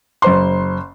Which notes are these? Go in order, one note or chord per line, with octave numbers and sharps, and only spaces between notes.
F#1 C5 C6